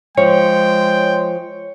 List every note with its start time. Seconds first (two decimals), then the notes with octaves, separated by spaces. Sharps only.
0.17 F3 G#3 C#5 G5